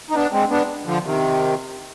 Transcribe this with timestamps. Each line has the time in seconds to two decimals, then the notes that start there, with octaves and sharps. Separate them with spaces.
0.10 D#4
0.14 B3 D4
0.32 G#3 C4
0.50 B3 D4
0.86 D3 F3
1.04 C3 D#3